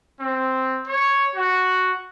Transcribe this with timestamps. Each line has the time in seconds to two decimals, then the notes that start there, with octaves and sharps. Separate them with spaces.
0.20 C4
0.87 C#5
1.35 F#4